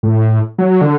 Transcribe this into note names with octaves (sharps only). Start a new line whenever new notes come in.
A2
F#3
D3